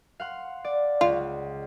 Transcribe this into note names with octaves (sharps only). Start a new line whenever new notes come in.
F5 F#5 C6
D5
C#2 F4